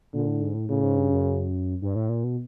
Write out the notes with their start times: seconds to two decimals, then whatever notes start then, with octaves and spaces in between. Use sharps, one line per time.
0.13 A#2 D3
0.27 A2
0.41 G#2
0.54 A2
0.69 A2 C#3
0.83 G#2
0.97 G2
1.11 F#2
1.82 G2
1.95 A2
2.09 A#2
2.24 B2